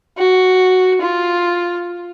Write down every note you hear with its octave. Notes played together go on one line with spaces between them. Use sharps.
F#4
F4